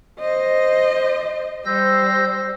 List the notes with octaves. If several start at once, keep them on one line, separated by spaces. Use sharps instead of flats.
C5 D#5
G3 C5 E6 G6 A#6